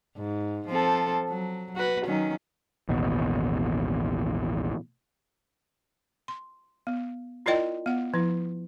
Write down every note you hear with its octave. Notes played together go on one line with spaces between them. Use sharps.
G#2
F3 C4 A4
F#3
F#4 B4
D#3 F#3 C#4
A1 D#2 B2
C6
B3
E4 F4 A#4 D5 D#5 G5
B3 F#5
F3 E4